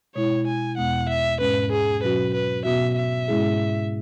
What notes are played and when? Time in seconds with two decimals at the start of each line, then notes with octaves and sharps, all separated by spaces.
0.15 B2 G#3 E4 C#5
0.47 G#5
0.77 E2 B2 G#3 B3 F#5
1.09 E5
1.40 G#2 G#3 C#4 B4
1.72 G#4
2.03 B2 F#3 C#4 F#4 B4
2.34 B4
2.65 B2 B3 F#4 E5
2.97 E5
3.28 G#2 G#3 C#4 E4 G#4